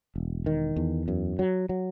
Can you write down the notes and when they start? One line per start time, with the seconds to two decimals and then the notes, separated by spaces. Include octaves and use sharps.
0.16 E1
0.46 D#3
0.76 E2
1.08 F#2
1.39 F#3
1.69 F#3